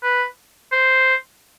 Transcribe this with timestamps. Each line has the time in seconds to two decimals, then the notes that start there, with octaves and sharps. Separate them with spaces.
0.03 B4
0.72 C5